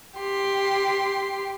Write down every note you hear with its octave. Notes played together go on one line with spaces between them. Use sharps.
G4 C6